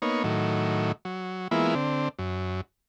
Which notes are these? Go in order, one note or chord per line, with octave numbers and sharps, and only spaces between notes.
A#3 B3 D#4 C#5
A2 D#3 F#3
F#3
E3 G#3 A#3 B3 E4 F4
D3 C4
F#2